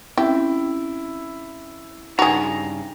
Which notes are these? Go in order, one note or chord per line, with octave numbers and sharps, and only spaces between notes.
C4 C#4 E4 G4 E5
G2 C#3 D#4 F#4 G#4 A#5